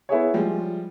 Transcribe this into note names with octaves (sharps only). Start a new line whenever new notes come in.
B3 E4 G#4 C#5
F3 G3 G#3